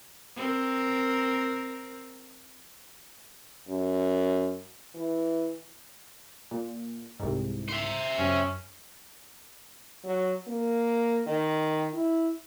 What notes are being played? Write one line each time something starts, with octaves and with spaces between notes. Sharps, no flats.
C4 A#4
F#2
E3
A#2
C2 G#2
C5 E5
F#2 C#4
F#3
A#3
D#3
E4